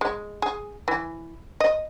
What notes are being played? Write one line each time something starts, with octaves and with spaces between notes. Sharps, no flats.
G#3
G#4
E3
D#5